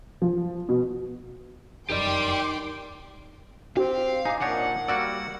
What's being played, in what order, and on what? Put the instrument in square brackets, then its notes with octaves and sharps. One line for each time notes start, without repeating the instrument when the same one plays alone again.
[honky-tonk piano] F3
B2
[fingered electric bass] F1 F#2 [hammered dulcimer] D#3 [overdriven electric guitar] G4 D5 [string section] G5 C6 D6
[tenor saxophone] C4 [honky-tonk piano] G4 [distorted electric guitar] F5
[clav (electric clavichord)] D#4 [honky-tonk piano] G#5 D6
[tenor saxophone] A#2 [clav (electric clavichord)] D4 D#4 C#5 [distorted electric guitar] F#5
[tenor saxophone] G3 [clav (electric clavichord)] A#3 F#4 D5 [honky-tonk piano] E6